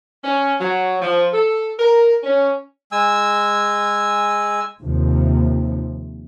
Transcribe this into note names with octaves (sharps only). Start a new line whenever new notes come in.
C#4
F#3
F3
A4
A#4
C#4
G#3 G#5 E6
D#2 C3 F3